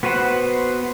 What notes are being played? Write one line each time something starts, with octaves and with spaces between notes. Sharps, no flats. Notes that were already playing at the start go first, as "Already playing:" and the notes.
B3 F#4 B4 C5 F#5